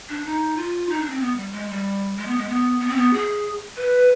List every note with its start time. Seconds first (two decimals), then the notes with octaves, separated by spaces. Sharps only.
0.09 D4
0.25 D#4
0.57 F4
0.89 D#4
1.00 D4
1.10 C4
1.21 B3
1.36 G3
1.52 G#3
1.70 G3
2.17 G#3
2.27 B3
2.38 G#3
2.49 B3
2.80 B3
2.89 C4
2.96 B3
3.13 G#4
3.77 B4